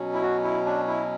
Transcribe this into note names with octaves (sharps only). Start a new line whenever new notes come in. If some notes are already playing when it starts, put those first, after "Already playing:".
Already playing: B2 F#3 C#4
E4
F#4
E4
D4
E4